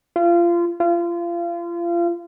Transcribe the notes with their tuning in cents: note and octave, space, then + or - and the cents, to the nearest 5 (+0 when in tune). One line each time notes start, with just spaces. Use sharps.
F4 -25
F4 -30